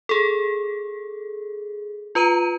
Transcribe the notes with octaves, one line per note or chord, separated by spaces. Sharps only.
G#4 A4
F4 B4 A#5 D#7